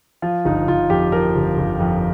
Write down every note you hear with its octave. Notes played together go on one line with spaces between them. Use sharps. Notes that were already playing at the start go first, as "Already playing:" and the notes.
F3 F4
G1 D#4
G1 F4
F2 G4
F3 A#4
G1
G1
F2